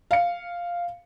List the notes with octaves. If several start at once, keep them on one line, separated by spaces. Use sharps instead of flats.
F5 C#7